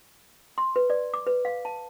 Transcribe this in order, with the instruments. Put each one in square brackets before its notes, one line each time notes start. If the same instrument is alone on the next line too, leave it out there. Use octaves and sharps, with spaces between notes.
[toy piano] C6
B4
D5
D6
B4
F5
A5